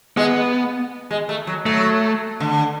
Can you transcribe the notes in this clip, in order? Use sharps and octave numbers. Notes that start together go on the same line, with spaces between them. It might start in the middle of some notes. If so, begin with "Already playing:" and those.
G#3 B3
G#3
A3
F#3
F#3 A3
D3